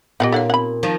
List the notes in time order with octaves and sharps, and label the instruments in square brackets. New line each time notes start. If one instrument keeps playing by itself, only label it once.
[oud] A#2 [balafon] B3 G4 [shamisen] D#5 F5 F#5
[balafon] D#4 C#5 F5 [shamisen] A4 F#5
[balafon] C4 [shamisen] F#5 B5
[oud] D#3 F3